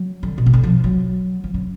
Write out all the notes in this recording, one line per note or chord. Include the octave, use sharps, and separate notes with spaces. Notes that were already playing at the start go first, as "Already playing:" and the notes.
Already playing: F#3
D3
B2
C#3
D3
F3
F#3
F3
C#3